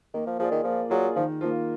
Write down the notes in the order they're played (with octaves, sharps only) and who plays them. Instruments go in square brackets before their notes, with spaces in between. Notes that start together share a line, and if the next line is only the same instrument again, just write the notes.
[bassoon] D#3 [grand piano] A#3
[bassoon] F3
[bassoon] F3 [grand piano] F4 G#4 D5
[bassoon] D#3
[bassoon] F3 [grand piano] A#3
[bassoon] F#3 [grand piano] F4 G#4 D5
[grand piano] D#3 [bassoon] F3
[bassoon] F3 [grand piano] A#3 F4